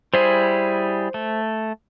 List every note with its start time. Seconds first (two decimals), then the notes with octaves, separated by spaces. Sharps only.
0.14 G3 E4 G#4 C5
1.14 A3